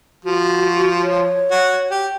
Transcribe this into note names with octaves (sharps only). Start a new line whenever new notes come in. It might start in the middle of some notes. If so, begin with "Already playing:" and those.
F3 F#4
C#5
F#4
G4